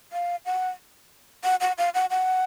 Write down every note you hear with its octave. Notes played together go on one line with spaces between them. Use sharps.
F5
F#5
F#5
F#5
F5
F#5
F#5